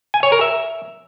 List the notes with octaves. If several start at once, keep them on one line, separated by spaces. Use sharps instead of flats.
G#5
C#5
A#4
E5